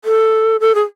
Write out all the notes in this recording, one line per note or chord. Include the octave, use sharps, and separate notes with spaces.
A4
A4
G#4